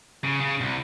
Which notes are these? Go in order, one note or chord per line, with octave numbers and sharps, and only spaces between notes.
C#3
C#3
C2